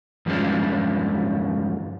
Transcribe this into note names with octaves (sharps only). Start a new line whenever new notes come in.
E2 G2 F3 G#3 C#4 D4